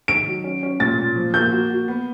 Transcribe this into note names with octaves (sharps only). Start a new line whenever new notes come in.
D#3 D7
F#3
C#4
C#4
A#2 A6
A#2
F3
A#3 G6
F#4
F#4
B3